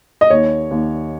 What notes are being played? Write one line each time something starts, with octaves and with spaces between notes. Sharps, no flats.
D#5
D#2 C#5
D#2